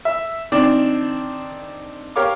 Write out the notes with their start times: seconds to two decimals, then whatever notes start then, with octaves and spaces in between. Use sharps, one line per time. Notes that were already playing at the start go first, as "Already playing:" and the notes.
0.05 E5
0.52 D#3 C4 D4 D5
2.16 G4 A#4 C#5 F5 D6